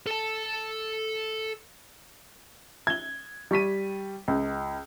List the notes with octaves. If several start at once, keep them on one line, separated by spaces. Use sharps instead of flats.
A4 A5
G#6 G7
G3 C#6 B6 D#7
C#2